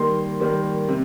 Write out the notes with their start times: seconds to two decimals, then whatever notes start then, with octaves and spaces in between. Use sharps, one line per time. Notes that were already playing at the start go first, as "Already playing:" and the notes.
Already playing: D#3 G3 A#3 C6
0.40 D#3 G3 A#3
0.88 C3